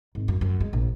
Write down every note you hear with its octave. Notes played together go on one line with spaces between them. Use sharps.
G#1
F#2
F#2
G#3
A#1